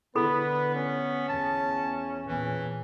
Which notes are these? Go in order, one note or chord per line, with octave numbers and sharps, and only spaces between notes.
D3 B3 E4 A4 B4 B5
C#4
E2 A5
E2 A#2 E3